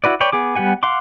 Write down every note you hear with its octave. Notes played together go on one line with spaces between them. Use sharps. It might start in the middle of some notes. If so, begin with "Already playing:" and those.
E4 F#4 B4 D5
B4 C#5 D5 G5
B3 G#4 D6
G3 B3 G4 F#5 G#5
F5 F#5 C6 D6